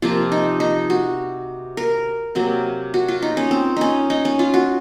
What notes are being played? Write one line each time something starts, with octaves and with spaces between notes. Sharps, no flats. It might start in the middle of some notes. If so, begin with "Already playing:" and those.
C3 F3 A#3 F4
D#4
D#4
F#4
A#4
C3 F#3 A#3
F#4
F4
D#4
C#4
C4
C#4 D#4
D#4
C#4
F4
F#4